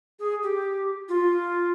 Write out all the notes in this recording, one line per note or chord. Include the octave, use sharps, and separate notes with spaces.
G#4
G4
F4